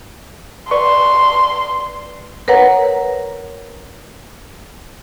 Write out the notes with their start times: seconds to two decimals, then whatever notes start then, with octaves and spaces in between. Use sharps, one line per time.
0.71 B4 D5 C6 C#6
2.48 A#4 B4 C#5 F#5 A#5